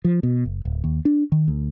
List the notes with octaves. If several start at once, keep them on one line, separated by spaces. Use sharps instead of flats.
F3
B2
F#1
D1
D#2
D4
D#3
D2